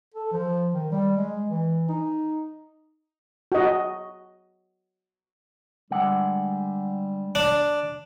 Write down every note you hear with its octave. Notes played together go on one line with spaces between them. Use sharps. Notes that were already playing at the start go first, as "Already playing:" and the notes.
A4
F3
D#3
G3
G#3
E3
D#4
F#4 D#5
D3 G3 G#3 F#5
D4